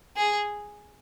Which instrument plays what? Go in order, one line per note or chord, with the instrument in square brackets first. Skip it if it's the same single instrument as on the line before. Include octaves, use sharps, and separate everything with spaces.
[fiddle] G#4